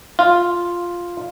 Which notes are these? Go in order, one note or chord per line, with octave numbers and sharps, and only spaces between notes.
F4